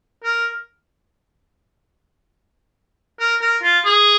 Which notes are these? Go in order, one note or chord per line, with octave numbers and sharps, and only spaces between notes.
A#4
A#4
A#4
F4
G#4